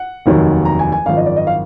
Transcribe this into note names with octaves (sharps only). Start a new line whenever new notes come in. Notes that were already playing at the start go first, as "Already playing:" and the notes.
Already playing: F#5
F1 D#2 D#3 F#3
A#5
G#5
G#5
G#1 F#2 F3 F5
D#5
D5
D#5
F5